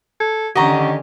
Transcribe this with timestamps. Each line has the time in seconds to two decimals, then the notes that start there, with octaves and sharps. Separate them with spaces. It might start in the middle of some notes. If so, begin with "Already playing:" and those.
0.20 A4 G#6
0.56 D3 D#3 C#4 G4 D#5 F#5 A#5 C#6